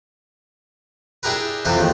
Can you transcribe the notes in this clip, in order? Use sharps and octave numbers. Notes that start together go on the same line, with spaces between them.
D4 E4 G4 G#4 A#4 B4
C3 E3 F3 G4 A4 B4
D#2 G#3 A3